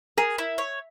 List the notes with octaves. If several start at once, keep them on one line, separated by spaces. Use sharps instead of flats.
G#4 A#4
E4
C#5